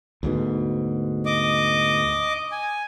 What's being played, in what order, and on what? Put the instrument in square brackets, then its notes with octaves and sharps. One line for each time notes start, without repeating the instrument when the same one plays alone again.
[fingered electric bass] D2 G#2 B2
[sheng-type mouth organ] D#5 D6
G#5